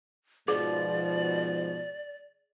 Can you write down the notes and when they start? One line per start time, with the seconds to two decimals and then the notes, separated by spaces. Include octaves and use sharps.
0.48 G#2 B2 F3 G#4 D5